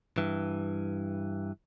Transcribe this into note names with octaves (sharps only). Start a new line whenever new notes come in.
G2 E3